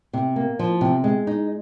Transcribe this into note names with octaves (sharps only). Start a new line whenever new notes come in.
C3
A#3
F3
C3
G#3
D#4